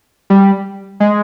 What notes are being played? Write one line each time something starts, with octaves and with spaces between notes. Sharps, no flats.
G3
G#3